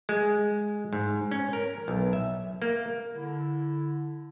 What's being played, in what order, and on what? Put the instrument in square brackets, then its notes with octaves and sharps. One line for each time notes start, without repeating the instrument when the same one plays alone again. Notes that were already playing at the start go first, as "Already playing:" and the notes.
[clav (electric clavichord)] G#3
G#2
C#4
A#4
B1
E5
A#3
[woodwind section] D3 E4